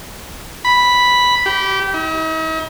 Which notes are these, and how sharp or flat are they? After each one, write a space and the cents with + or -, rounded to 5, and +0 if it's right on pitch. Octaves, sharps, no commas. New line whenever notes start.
B5 -5
G4 -20
D#4 +45